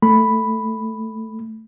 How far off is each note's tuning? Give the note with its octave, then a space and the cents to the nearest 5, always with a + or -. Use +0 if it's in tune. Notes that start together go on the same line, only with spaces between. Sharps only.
A3 +0 B5 +0